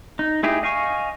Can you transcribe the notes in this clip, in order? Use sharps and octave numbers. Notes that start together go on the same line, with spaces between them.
D#4
A3 D#4 E4 G4 G#4
D#5 F5 G#5 C#6